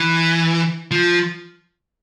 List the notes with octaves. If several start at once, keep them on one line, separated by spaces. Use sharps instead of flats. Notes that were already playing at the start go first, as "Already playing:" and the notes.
Already playing: E3
F3